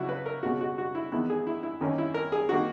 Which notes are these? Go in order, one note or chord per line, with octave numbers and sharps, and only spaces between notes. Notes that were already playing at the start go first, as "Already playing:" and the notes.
Already playing: C#2 C#3 F#3 E4 F#4
B4
A#4
C#2 B2 G#3 F#4
F#4
F#4
E4
E2 D#3 G#3 B3 E4
G#4
E4
E4
D#2 D#3 A#3 C#4
E4
A#4
G#4
D#3 A#3 F#4